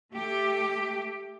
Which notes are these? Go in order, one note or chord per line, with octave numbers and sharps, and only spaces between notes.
A3 G4